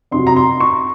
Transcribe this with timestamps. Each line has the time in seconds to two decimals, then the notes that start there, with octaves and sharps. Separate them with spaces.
0.11 F2 C3 F#3 C6
0.27 A#5
0.36 C6
0.60 C#6